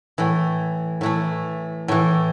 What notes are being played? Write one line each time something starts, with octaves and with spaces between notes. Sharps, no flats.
A2 E3
A2 E3 A3
A2 E3